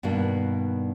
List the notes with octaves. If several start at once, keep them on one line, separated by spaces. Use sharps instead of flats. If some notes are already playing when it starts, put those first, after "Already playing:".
G2 B2 D#3 A#3 D4